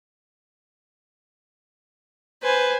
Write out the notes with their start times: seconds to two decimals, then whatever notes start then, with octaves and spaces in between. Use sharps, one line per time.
2.43 B4 C5 G#5